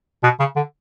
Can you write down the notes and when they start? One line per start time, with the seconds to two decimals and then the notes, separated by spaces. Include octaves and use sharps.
0.23 B2
0.39 C#3
0.56 D3